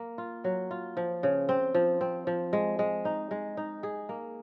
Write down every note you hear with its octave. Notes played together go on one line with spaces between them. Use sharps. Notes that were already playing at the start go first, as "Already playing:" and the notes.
Already playing: A#3
F4
F#3
F4
F3
C#3
C4
F3
C4
F3
G#3
G#3
D#4
G#3
D#4
G#4
A#3